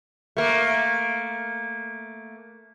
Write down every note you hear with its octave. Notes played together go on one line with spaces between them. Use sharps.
A3 A#3